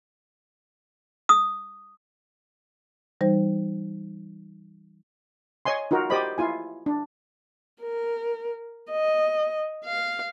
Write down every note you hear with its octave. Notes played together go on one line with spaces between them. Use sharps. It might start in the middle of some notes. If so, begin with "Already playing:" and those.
D#6
E3 G3 D#4 C5
C#5 D#5 G#5 C6
D#4 F4 F#4 A#4
G4 C5 D5 D#5 B5
E4 F4 G#5
D4
A#4
D#5
F5